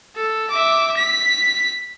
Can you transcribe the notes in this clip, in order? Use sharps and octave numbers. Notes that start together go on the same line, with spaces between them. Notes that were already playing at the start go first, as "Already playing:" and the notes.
A4
E5 D6
B6